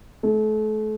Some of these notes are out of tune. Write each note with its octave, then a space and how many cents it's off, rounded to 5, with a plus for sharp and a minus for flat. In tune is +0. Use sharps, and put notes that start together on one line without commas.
A3 -35